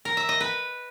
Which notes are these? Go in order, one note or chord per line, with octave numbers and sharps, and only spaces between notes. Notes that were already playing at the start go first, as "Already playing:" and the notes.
A#4
E5
D#5
B4